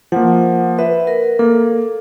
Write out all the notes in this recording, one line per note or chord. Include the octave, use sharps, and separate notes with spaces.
F3 A#3 F#5
B4 E5
A#4
A#3 A4